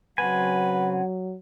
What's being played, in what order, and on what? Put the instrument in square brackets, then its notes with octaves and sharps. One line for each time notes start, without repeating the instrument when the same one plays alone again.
[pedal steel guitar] C#3 C4 G#5 [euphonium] F#3 [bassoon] B4 [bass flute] F#5